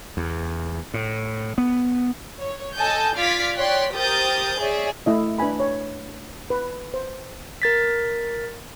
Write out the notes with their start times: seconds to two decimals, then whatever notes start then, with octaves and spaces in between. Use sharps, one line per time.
0.17 E2
0.94 A2
1.58 B3
2.39 C#5
2.76 A4 D#5 G#5 A5 G6
3.16 F4 D5 D6 F6 G#6 B6
3.57 C#5 D5 G5 C6 F#6 B6
3.94 G4 A#4 C5 D#6 G6 A6
4.59 G#4 C#5 D5 E5
5.06 A3 E4 D#5
5.39 D4 B4 E5 G#5 B5
5.60 C#5
6.50 B4
6.94 C5
7.62 A#4 A6 B6